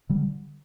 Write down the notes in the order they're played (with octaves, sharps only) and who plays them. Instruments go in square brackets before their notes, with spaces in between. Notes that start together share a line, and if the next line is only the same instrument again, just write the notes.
[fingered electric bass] D3 G3